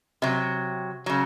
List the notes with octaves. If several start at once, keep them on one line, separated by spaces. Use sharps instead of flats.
C3 F#3
C#3 F#3